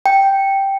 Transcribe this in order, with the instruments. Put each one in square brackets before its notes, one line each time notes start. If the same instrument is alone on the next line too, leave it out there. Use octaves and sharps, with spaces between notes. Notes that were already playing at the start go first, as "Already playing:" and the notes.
[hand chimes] G5